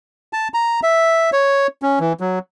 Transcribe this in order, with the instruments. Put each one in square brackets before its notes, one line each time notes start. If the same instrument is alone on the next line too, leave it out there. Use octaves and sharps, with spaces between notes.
[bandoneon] A5
A#5
E5
C#5
C#4
E3
F#3